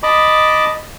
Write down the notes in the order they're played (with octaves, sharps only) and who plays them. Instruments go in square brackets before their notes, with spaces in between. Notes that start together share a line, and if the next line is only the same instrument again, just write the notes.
[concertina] D#5 A5 B5 D6